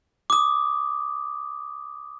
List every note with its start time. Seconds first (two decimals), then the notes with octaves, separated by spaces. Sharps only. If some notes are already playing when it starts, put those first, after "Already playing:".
0.30 D6 D#6